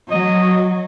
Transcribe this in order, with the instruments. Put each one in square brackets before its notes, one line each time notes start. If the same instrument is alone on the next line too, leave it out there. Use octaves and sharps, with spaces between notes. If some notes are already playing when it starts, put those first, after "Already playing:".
[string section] F#3 [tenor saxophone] D#5